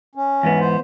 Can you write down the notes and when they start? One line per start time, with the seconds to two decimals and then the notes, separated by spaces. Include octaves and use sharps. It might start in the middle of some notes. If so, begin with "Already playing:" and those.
0.15 C#4
0.43 E2 G#2 B3
0.60 C5